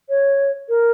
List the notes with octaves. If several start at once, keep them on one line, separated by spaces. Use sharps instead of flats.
C#5
A#4